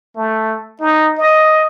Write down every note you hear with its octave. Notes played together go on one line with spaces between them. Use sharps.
A3
D#4
D#5